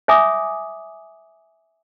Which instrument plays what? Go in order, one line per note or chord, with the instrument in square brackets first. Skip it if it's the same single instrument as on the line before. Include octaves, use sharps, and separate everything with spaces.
[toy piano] C#5 E5 G#5 D6 D#6